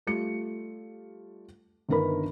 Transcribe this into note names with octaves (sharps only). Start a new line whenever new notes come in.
G3 A3 F4 C#7
G1 D3 D#3 A#4 B4 B5